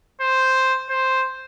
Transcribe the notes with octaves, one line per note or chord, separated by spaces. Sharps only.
C5
C5